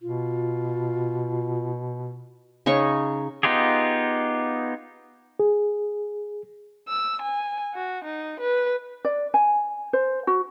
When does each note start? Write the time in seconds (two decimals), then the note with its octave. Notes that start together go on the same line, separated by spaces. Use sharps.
0.02 B2 F4
2.66 C#3 D#4 C#5 C#6
3.43 B3 D#4 F4 G4 G#4
5.40 G#4
6.88 E6
7.22 G#5
7.74 F#4
8.05 D#4
8.40 B4
9.05 D5
9.34 G#5
9.93 C5
10.27 F#4